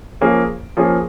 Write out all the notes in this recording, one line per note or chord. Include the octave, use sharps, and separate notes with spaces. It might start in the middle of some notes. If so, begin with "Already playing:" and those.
F3 A#3 C#4 G#4
F3 A#3 C#4 G#4